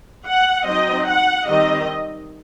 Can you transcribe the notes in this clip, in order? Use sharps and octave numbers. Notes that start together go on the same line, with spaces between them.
F#5
F#3 C4 D#4 D#5
F#5
D#3 G3 C4 D#4 D#5